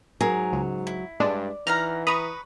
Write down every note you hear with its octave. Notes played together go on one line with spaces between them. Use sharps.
G#2 F#3 G#4 A#4
C#2
E4
G2 G#3 D4 D5
E3 D#4 F#5 A#5 F6
B4 A#5 B5 C#6 D#6